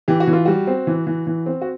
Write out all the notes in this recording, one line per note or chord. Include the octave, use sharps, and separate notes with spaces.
E3 G4
F#4
E3
F4
G3 F#4
C4
E3
E3
E3
C4
F#4